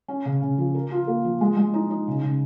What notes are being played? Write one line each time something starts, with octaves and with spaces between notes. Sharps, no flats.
C#4
C#3
C#3
F3
A#4
F4
A#3
F3
G#3
G#3
D#4
D#4
C#3
C#3